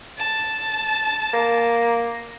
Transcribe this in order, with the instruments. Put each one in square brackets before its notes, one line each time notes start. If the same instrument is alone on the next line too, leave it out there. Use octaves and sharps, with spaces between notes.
[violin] A5
[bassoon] A#3